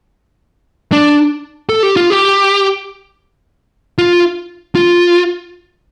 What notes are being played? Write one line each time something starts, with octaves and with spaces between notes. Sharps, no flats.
D4
A4
G4
F4
G4
F4
F4